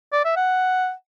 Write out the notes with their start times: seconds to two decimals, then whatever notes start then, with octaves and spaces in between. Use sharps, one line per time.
0.13 D5
0.25 E5
0.36 F#5